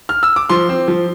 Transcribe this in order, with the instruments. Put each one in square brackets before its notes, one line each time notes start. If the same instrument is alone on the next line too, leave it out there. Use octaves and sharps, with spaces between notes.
[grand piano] F6
E6
D6
F3 C6
C4
F3